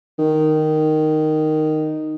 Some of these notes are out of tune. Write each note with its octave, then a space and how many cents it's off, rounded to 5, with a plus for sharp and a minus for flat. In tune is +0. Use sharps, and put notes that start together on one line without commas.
D#3 -5